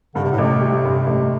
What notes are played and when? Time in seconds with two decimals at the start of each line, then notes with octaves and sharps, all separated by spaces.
0.15 G2 D3
0.24 C3
0.32 A2
0.38 A1 C3
0.61 G3
0.85 G2
1.07 A1